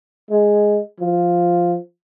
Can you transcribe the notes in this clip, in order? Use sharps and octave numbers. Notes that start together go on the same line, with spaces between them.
G#3
F3